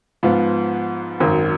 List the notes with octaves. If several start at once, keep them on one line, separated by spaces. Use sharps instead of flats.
G#2 F3 B3 F4
G#1 F#2 D#3